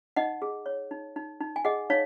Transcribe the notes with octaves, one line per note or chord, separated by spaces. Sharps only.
D#4 D#5 F#5
G#4
C#5
D#4
D#4
D#4
G#5
G#4 D#5 F#5
D#4 C#5 F5